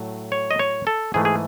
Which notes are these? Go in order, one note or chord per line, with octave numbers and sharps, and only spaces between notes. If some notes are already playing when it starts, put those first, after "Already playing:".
Already playing: A2 F#3 A3
C#5
D#5
C#5
A4
G#2 E3 A3 G#4
G#4